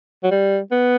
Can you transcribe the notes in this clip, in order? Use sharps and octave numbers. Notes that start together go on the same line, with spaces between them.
F#3
G3
B3